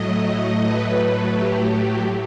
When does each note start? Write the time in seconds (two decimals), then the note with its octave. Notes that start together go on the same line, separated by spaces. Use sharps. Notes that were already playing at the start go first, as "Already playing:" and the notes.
Already playing: A2 F#3 A3 D#5
0.65 B4
1.35 G4